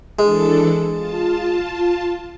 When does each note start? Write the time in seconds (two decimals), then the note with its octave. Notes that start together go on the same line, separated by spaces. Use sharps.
0.19 E3 G#3 D4 A4
0.91 F4 A5